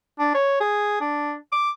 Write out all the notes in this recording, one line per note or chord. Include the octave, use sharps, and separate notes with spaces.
D4
C#5
G#4
D4
D6